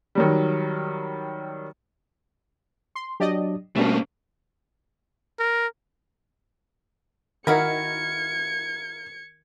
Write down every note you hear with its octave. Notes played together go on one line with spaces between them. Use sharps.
D#3 F#3 G3
C6
F#3 D4 G4 D5 D#5
B2 G3 A3 A#3 C#4 D4 C5
A#4
D#3 D#4 E4 F#4 A#4 F5 G#6 C#7